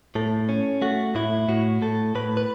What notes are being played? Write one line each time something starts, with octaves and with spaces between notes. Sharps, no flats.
A2 A4
C#4
A3 F#4
A2 E4
A2 F#4
A2 A4
A2 B4
B4